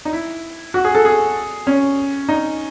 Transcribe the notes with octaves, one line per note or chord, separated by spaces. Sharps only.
D#4
E4
F#4
G#4
A4
G#4
C#4
D#4